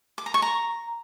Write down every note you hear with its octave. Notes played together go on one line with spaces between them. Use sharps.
D6
A#5
C#6
A#5